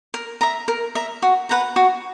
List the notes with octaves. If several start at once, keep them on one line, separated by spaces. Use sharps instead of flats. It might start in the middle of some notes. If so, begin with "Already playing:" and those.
A#4
E5 A#5
A#4
E5 A#5
F#4
B4 F#5 A#5
F#4